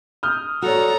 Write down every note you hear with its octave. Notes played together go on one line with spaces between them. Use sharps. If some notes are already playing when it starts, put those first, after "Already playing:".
D#6 F6 G6
F#4 A4 C#5 D5 A#5